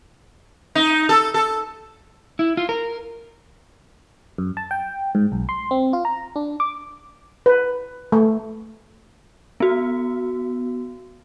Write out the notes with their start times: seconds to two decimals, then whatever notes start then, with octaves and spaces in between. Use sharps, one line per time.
0.75 D#4
1.09 A4
1.34 A4
2.39 E4
2.57 F4
2.69 A#4
4.38 F#2
4.57 A5
4.71 G5
5.15 G#2
5.32 B1
5.49 C6
5.71 C4
5.93 F4
6.05 A#5
6.36 D4
6.60 D6
7.46 B4
8.12 A3
9.60 B3 F#4